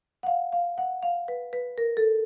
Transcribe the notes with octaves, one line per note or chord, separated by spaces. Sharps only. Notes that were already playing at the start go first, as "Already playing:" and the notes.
F#5
F5
F5
F#5
F5
B4
B4
A#4
A4